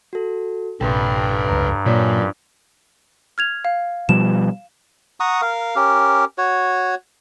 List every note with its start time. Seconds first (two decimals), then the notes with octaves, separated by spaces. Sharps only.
0.13 F#4 A4
0.81 A#1 G2 C3 A4 B4 G5
1.49 F1 C#2 A#5
1.86 F#2 A#2 A#3 F4 C#5 D5
3.38 F6 G#6 F7
3.65 F5
4.09 B2 F3 G3 E7
5.20 F#5 A#5 C#6 D#6
5.42 A#4 F5
5.76 C#4 G4 A#4
6.38 F#4 C#5